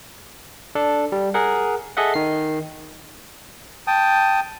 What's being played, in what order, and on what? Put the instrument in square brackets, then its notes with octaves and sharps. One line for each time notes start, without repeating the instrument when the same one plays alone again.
[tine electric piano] D4 A4
G3
G#4 A#4 F#5
G#4 A4 D#5 E5 F#5
D#3 C7
[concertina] G5 A5 D#6